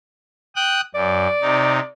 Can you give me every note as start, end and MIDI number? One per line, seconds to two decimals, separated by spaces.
0.56 0.81 79
0.56 0.81 87
0.56 0.81 90
0.95 1.27 42
0.95 1.91 74
1.42 1.80 48
1.42 1.80 63